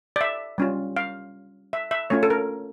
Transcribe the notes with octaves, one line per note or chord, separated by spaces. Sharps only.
D5
E5
G3 C#4 F4
F5
E5
E5
A3 C#4 F4 C#5
A4
A#4